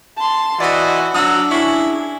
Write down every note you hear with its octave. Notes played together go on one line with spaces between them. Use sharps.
A5 C6
E3 F#4 D5 D#5
F#3 D4 D#6 E6
C#4 E4 G#4